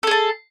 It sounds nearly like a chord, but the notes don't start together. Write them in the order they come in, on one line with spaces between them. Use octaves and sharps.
A4 G#4 A5